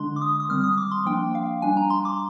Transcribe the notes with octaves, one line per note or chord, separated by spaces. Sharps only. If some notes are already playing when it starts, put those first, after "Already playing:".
Already playing: D3 G#3 D4 C6
D6
D#6
D#6
D#3 G3 C4 F6
D#6
D6
C6
F3 A#3 D4 G5
F5
G3 D4 G#5
A#5
C6
D6